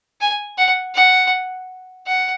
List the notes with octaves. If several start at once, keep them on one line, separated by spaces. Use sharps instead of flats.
G#5
F#5
F#5
F#5